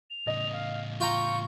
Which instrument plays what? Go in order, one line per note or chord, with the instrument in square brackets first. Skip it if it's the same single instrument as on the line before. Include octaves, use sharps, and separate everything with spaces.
[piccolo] F7
[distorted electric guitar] A2 C#3 [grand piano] D#5
[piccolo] F5
[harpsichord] F4 G5 A#5 [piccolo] C#6